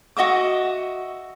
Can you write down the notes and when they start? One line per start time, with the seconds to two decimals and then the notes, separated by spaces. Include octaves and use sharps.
0.17 F#4 D#5 E5 D6